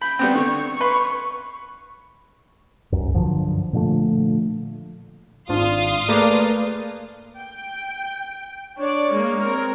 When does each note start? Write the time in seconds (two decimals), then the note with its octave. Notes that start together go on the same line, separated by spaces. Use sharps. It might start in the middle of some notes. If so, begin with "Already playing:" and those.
0.02 B5 G6
0.19 G3 B3 C4
0.35 D3 C#6
0.81 B4 B5 C6
2.92 C2 F#2
3.14 G2 D3 F3 F#3
3.73 A#2 D3 F3 A3
5.49 G#1 G#2 D4 F4 F5 C6 D#6
6.09 A3 A#3 G#4 A#4 B4 D5 A5
7.39 G5
8.78 D4 C#5 D5
9.13 G#3 A#3
9.42 C4 A#4